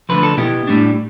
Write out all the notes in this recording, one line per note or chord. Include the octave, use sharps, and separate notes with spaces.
D2 D3 F3 B4
A4
B2 B3 E4 G4
A2 G3 D4